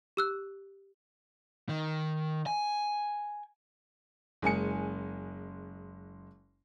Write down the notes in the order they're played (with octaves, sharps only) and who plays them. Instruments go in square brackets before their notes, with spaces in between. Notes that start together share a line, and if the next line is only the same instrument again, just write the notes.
[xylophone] G4 E6 F#6
[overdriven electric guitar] D#3
G#5
[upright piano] F#1 G#3 G#5 C#7